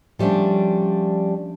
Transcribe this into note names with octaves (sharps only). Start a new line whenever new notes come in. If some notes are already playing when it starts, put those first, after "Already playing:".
F3 G3 A3 C#4 D4